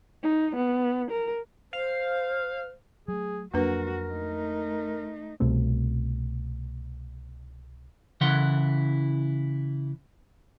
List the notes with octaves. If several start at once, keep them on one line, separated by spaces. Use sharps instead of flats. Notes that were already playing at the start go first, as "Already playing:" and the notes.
D#4
B3
A#4
C5 F5
F#3 A3 G#4
F2 F#3 A#3 D4 F#4 A#4 B4
A3 D#4
C2 B2 A3 C4
C#3 E3 E4 F#5 C6